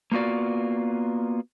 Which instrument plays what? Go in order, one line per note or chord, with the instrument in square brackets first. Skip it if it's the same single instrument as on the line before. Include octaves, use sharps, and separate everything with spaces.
[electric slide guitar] A#3 B3 F4 F#4 D5